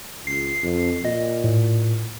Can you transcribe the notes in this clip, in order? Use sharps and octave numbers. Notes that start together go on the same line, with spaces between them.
C#2 C7
F2
A#2 D#5
A2